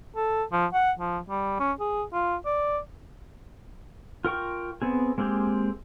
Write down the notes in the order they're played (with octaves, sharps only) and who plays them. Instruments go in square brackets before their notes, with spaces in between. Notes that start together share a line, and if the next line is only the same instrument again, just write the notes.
[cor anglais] A4
F3
F#5
F3
G3
C#4
G#4
F4
D5
[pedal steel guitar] F4 A#4 G5 C#6
B3 C4 G#4
G#3 A#3 C4 G4 G#4